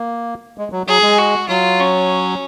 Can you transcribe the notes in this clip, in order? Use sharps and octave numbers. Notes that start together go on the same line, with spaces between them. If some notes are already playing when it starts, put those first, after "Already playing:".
Already playing: A#3
G#3
F#3
F#3 G#4
G#3
F#4
F#3 F4
C#4